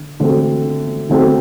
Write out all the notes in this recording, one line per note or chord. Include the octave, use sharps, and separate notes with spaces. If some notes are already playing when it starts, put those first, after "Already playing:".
Already playing: D3
D3 A3 C4 F#4 A4
D3 A3 C4 F#4 A4